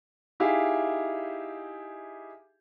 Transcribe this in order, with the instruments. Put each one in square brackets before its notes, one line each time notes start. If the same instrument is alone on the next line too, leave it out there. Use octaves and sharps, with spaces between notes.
[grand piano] D#4 E4 G4 G#4 E5 F5